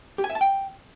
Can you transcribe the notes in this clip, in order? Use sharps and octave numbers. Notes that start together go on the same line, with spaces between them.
G4
G#5
E5
A5
G5